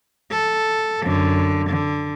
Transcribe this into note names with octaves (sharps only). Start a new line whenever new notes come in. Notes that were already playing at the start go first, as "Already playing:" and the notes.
A4
F#2 D3
D3